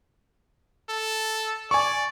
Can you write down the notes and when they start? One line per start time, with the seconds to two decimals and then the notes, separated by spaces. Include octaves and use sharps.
0.89 A4
1.71 D5 G#5 C#6